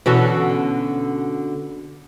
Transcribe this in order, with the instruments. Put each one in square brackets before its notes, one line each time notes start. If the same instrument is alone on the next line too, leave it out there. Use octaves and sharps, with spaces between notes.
[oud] B2 D3 C#4 [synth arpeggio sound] E3 F#4 A4